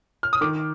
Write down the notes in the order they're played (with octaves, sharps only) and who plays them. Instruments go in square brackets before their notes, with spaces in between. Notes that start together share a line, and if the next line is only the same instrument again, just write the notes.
[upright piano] F6
D#6
D#3 D6